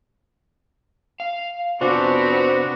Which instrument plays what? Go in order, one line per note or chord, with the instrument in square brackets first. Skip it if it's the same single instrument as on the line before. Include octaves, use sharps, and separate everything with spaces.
[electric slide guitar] F5
[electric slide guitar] C3 F4 [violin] B3 C4 [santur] D4 C5 [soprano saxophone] F#4